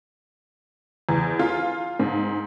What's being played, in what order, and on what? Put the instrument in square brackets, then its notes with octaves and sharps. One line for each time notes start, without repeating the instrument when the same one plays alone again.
[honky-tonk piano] E2
F4
G#2